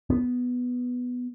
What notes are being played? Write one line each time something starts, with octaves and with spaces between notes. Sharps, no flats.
B3